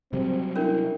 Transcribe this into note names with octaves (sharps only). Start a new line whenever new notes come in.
C3 F#3 G3 C4
C#4 D4 E4 A#4